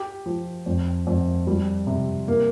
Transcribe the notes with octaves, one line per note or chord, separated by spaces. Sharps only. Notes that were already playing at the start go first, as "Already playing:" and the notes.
Already playing: G4
F3
F2
F2
G3
C3
A#3